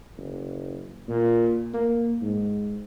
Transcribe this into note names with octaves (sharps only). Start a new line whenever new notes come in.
F#1
A#2
A#3
G#2